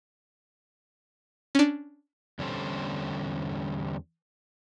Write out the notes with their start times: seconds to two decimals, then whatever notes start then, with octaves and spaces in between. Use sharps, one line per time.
1.55 C#4 D4
2.39 E2 D3 G3 C#4 A4 C5